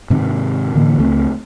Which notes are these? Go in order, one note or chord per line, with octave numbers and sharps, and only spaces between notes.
G#2 C3 D#3
A2 D3 E3 A#3
C#2 A3 C4